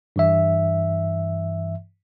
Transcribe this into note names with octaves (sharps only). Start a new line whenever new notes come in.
G2 E3 E5